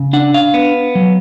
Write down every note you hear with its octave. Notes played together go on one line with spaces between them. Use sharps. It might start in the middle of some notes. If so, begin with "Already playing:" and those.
Already playing: C#3
D4 F#5
F5
B3
F#3